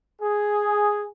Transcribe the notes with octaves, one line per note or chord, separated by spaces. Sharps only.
G#4